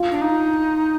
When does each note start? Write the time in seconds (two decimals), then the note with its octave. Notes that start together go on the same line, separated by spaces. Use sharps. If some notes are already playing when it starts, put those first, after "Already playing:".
Already playing: F4
0.12 D4
0.21 D#4